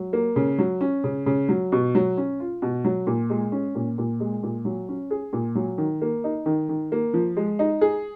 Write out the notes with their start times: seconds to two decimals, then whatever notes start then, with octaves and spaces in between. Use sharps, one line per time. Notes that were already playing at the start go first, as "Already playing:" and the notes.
Already playing: F#3
0.13 A#3
0.36 C#3
0.59 F#3
0.81 C#4
1.04 C#3
1.26 C#3
1.49 F#3
1.72 B2
1.95 F#3
2.17 C#4
2.40 F4
2.62 B2
2.85 F#3
3.07 A#2
3.30 G#3
3.52 C#4
3.75 A#2
3.98 A#2
4.20 G#3
4.43 A#2
4.65 F#3
4.89 C#4
5.11 G#4
5.33 A#2
5.55 F#3
5.78 D#3
6.02 A#3
6.24 D#4
6.46 D#3
6.69 D#3
6.92 A#3
7.14 F3
7.37 G#3
7.59 D#4
7.81 G#4